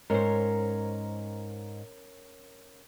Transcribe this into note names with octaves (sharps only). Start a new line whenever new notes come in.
G#2 C#4 A#4 C5